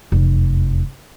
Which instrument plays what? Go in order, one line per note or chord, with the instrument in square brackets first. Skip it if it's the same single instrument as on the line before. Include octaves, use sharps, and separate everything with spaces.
[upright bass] F1 E2